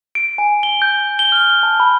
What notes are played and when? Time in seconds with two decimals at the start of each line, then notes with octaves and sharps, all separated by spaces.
0.15 D7
0.38 G#5
0.63 G7
0.82 G6
1.19 G7
1.32 F6
1.63 A5
1.80 B5